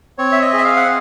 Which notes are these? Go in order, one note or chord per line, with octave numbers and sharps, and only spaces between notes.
C4 C#5
E5
D#5
G#4
E5
F5
F#5